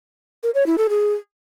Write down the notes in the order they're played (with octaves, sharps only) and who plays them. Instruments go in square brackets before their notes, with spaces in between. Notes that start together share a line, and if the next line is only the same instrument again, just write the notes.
[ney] A#4
C#5
E4
A4
G#4